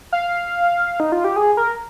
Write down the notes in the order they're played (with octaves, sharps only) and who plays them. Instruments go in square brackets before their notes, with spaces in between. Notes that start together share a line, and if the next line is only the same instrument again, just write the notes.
[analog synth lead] F5
D#4
F4
G4
G#4
A#4